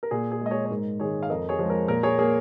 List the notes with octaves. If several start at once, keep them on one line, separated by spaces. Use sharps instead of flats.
A#4
A#2 G#4
G#4
G#3
D#5
G#4 C#5
C#5
G#2 A#4
D#3 G#3 G#4 C#5
F5
F2 A#4 D#5
G#4 C#5
F3 G#3
A#4
A#2 A#4
G#4 C#5
A#3 G#4